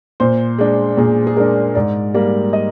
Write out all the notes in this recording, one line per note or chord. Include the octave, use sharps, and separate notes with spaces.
A#2 C5
G#3 D4
A#2 G#4
G#4
G#3 D4 A#4
G#2 D5
G3 A#3
D#5